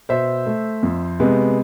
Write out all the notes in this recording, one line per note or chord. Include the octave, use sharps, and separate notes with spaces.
B2 C5 E5
A3
F2
C3 G#3 B3